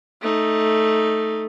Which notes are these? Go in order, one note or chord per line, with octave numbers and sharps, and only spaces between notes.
A3 D#4